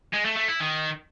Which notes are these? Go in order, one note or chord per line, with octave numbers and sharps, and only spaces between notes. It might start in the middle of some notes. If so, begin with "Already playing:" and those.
G#3
A3
A3
E4
D#3